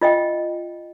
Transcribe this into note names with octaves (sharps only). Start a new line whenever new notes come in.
F4 D#5 E5 G5